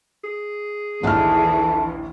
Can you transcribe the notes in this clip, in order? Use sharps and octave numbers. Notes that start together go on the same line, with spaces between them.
G#4
A#1 D#2 E3 A3 D4 G5 F6